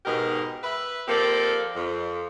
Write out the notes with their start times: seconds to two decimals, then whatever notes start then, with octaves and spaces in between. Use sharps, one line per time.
0.05 G#2 B2 G4 G#4 A#4
0.63 B4 E5
1.07 F3 A#3 C4 G4 A4 D5
1.75 F2